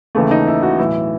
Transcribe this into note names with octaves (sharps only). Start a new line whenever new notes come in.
D#2 C#3 E3 A3
D#4
E4
F#4
B1 A2 E3 E4